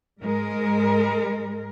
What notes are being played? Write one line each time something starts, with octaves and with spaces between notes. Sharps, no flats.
G#2 G#3 A#4